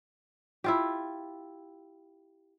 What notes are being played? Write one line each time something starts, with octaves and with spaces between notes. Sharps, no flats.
E4 F4 G4